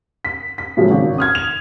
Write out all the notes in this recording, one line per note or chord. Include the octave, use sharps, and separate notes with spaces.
B6
B6
A2 C#3 F3 F#3 G#3 A#3
G#1 C#3
D#6 F6 G#6
F7